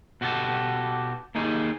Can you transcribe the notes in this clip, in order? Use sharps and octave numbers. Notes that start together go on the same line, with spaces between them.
B2 F#4 G4 A4 A5
D#2 A#3 D#4 G#4